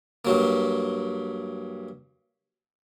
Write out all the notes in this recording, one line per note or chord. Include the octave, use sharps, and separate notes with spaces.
G2 F#3 A#3